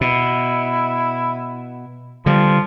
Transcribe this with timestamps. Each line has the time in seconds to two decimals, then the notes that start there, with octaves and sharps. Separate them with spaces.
0.01 B2 E4
2.26 D3 F3 G3